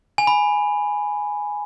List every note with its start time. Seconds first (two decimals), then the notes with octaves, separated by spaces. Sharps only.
0.18 G#5
0.27 B5